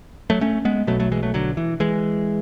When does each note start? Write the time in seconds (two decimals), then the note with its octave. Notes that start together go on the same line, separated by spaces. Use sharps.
0.30 F#3 A3
0.41 A3 C#4
0.65 G#3 B3
0.87 B1 B2 F#3 A3
1.00 F#3 A3
1.12 E3 G#3
1.23 F#3 A3
1.34 D3 F#3
1.57 E3
1.80 E3 G#3